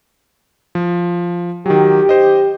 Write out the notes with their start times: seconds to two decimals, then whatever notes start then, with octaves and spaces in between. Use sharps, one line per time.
0.75 F3
1.66 D#3 F#3 G4
2.09 C5 D#5